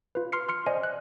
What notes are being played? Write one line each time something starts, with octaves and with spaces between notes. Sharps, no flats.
F4 B4
C6 F6 C7 C#7
C6 F6 C#7
C5 D5 D#5 G#5
F#6